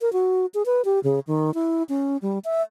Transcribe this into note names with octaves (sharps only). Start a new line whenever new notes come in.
A#4
F#4
G#4
B4
G4
C#3
D#3
E4
C#4
G3
E5